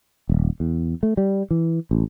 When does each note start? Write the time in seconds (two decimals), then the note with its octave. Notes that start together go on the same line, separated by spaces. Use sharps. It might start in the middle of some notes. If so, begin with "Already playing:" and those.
0.29 D#1
0.60 E2
1.03 A3
1.17 G3
1.51 E3
1.91 A1